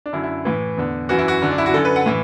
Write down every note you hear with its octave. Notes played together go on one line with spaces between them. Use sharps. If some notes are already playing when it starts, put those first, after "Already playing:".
D4
F#2 D3 E4
E4
A2 E3
E2 D3
F#2 E3 F#4
E4
F#4
F#2 D3
D4
E4
F#4
F#2 D3 A4
B4
F#5
A2 E3